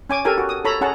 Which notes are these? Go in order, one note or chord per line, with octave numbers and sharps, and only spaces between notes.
C#4 G#5 D6
G4 A4 A#4 G#5
F#4
D#6
A4 C#5 A#5 B5
C#4 G#4 F#5 A5 A#5